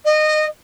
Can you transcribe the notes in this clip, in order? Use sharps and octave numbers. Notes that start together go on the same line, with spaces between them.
D#5